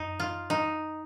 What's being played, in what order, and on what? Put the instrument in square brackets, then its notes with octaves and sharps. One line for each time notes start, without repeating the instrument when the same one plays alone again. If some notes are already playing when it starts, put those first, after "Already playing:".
Already playing: [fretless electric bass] F#2 [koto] D#4
[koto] F4
D#4